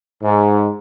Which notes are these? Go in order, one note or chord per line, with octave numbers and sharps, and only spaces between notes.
G#2